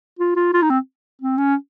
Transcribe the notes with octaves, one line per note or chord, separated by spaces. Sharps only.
F4
F4
F4
D#4
C4
C4
C#4